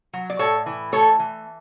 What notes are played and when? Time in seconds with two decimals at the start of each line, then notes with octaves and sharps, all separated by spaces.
0.13 F#3
0.30 D5
0.39 A2 A4 C#5
0.66 E3
0.92 A3 A4 C#5
1.19 E3